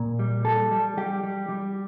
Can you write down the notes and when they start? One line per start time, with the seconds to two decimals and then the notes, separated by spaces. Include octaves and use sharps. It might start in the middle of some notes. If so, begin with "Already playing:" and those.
Already playing: A#2
0.19 G3
0.45 G3 A4
0.71 G3
0.97 G3 G4
1.24 G3
1.49 G3